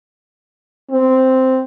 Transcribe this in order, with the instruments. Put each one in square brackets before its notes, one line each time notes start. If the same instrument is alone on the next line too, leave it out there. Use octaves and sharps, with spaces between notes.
[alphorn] C4